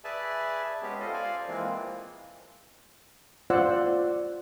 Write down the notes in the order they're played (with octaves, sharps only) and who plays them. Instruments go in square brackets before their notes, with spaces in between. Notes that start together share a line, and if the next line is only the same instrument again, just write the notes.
[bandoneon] G#4 B4 D5 E5 G#5 A5
G#3 B3 C#4 G4 G#4
F4 A4 C5 D#5
C5 D5 F5 G#5
E3 F3 G#3 A#3 C4
[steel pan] F4 C5 D5 F#5 E6